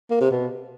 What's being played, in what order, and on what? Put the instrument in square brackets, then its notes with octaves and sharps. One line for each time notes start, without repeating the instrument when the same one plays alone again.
[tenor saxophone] A#3
C3
B2